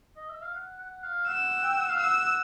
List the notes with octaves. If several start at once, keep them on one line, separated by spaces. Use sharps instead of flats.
D#5
E5
F5
F#5
F#5
F5
F#5 E6
G5
F#5
F5
E6
F#5